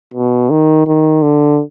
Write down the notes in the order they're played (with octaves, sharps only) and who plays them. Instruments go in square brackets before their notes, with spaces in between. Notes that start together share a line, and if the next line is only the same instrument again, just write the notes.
[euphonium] B2
D#3
D#3
D3